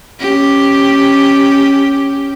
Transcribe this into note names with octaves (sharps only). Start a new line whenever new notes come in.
C#4 G4